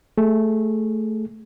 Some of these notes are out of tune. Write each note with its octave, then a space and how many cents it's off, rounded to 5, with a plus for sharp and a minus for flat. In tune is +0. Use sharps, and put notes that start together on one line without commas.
A3 +0 G#4 +0